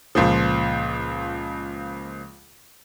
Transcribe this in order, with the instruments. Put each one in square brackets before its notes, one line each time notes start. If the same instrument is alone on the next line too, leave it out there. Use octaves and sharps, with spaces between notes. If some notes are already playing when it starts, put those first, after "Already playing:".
[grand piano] C#2 A#2 F3